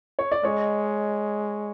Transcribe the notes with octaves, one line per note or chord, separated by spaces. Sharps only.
C#5
D5
G#3 C#5 D#5